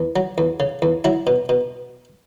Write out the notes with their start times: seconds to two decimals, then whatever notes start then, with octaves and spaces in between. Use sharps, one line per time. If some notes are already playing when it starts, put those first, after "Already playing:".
Already playing: E2
0.16 F#3
0.38 E2
0.60 C#3
0.82 E2
1.04 F#3 E4
1.27 B2
1.49 B2